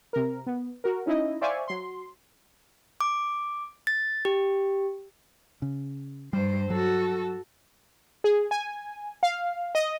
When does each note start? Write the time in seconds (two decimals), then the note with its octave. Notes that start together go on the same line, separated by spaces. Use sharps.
0.13 C3 A#4
0.47 B3
0.84 F#4 A#4
1.06 C#4 D#4 E4 D#5
1.41 C5 D5 E5 F5 G#5 C#6
1.68 F#3 C6
3.01 D6
3.87 A6
4.25 G4
5.62 C#3
6.33 G2 G3 C5
6.70 F#3 F#4 A4
8.24 G#4
8.51 G#5
9.23 F5
9.75 D#5